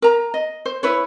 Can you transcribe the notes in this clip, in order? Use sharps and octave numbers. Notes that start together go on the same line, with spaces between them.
A#4 A#5
D#5
C5
E4 B4 C#5